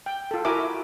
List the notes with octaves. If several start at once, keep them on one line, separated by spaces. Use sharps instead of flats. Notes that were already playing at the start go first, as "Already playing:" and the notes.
G5
F4 A4
E4 F#4 A#4 E5 G#5 D6